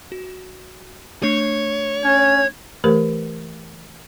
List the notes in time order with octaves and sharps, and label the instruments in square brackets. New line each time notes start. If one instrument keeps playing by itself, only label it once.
[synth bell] F#4
[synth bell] A3 D4 C7 [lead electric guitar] C#5
[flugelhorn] C#4 [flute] G#6
[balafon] E3 A3 G4 A#4 C5